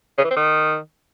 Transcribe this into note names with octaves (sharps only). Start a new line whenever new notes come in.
C#3
E3
C4
D#3